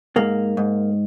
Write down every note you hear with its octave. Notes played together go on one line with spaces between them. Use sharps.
G#2 A#3
G#2